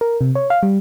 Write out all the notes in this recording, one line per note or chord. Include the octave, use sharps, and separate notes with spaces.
A#4
C3
C#5
F5
G3